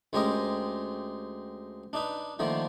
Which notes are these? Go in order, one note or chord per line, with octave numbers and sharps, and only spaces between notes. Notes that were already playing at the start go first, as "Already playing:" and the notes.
D2 G#3 C#4 G4 A#4 D#5
D4 D#4 B4
D3 D#3 F3 A3 A#3